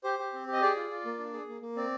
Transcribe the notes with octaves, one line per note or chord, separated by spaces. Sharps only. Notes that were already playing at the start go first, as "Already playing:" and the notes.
G4 C5
G4
C4
G4
D#5
G#4 D5
F4
F4
A#3
D4
G#4
A#3
A#3
C4 D5